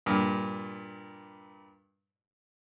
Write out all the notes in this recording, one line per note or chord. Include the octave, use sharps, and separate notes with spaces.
G2 A#2